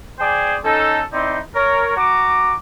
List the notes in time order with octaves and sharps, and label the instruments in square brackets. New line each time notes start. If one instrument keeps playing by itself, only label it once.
[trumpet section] G#4 C5 D5 G5 G#5
C#4 D#4 A4
C4 D#4 E4 D5 C6
A#4 C#5
F#4 A#5 D6